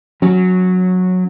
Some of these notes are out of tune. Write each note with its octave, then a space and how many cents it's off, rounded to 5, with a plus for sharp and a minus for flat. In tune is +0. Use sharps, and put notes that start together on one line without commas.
F#3 -15 C#4 +0